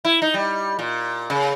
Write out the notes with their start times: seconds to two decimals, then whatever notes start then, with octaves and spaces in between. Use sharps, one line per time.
0.05 E4
0.22 D#4
0.34 G3
0.79 A#2
1.30 C#3